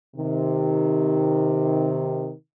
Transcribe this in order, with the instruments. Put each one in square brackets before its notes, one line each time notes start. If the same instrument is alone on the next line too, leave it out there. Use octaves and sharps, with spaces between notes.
[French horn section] C3 D#3